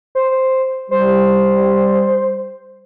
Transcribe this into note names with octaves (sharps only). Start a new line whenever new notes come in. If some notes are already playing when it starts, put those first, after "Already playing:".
C5
G3 C5